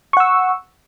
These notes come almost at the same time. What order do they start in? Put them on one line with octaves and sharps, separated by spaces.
C#6 F#5 E6